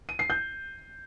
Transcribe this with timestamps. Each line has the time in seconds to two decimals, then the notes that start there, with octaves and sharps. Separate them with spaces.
0.09 D#7
0.19 C7
0.30 G6